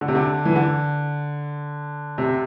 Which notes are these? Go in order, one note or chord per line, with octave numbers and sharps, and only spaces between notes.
D3
C3
D3
E3
D3
C3